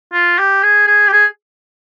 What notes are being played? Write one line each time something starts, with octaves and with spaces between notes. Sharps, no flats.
F4
G4
G#4
G#4
G4
G#4